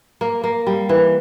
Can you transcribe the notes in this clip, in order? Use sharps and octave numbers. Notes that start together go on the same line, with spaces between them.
A#3
A#3
G3
E3